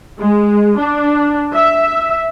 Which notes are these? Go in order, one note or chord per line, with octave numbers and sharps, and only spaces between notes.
G#3
D4
E5